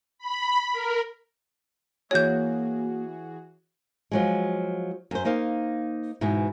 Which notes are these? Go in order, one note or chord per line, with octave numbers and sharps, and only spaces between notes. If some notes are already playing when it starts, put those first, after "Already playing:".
B5
A#4
E3 A#3 F#4 G#4 C#5 G6
F3 F#3 G#3
F#2 C5
A#3 D#4 C5 F5
G#2 B2 E3